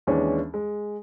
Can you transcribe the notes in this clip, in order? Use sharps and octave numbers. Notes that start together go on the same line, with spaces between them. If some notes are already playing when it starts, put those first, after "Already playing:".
D#2 E3 G#3 C#4 D4
G#3